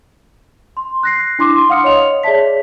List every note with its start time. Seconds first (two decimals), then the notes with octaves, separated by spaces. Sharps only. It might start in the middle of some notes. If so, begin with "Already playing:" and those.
0.77 C6
1.03 F#6 A#6 C7
1.39 D4 E4 C6 D6
1.70 F5 F#5 C6 D#6 F6 C#7
1.84 C#5 D#5 F7
2.23 G#4 C#5 D5 E5 A5 B6